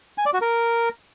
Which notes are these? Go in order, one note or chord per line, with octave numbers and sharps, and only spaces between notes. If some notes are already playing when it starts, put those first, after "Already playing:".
G#5
D5
F#4
A#4